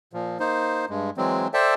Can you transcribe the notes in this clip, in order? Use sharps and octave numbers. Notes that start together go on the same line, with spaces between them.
A#2 F3
A#3 D#4 C5
G2 G#3
E3 F#3 G#3 C4
A4 C5 D5 E5 G5 A5